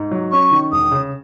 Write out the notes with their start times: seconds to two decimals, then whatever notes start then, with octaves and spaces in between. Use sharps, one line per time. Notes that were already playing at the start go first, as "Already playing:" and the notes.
Already playing: G#2
0.11 F#3
0.32 C#4 C#6
0.51 D#3
0.72 E1 D#6
0.92 C#3